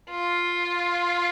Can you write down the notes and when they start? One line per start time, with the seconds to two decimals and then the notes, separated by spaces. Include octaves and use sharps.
0.10 F4